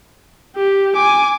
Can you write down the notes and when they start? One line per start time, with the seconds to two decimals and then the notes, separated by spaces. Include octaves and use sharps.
0.56 G4
0.95 G#5 D6